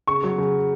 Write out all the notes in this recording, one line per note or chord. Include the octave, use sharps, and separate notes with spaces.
C#3 C#6
F#3
C#3